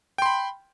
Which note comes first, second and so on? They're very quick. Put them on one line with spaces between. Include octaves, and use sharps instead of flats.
G5 C6 B5